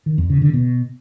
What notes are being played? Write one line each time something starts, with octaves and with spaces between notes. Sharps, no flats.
D#3
F2
C#3
D3
B2